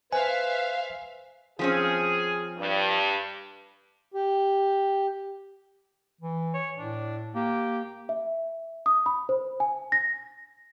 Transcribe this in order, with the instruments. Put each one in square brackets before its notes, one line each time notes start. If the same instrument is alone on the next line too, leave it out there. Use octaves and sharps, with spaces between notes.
[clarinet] B4 [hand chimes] C5 [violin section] E5 F5 [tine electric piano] G#5
[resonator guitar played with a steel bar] F3 C4 C#4 [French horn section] G#4
[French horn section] G2
[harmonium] G4
[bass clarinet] E3
[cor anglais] C#5
[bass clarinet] A2 [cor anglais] D4
[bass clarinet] A#3 [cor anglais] G4
[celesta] E5
D#6
B5
C5
G#5
A#6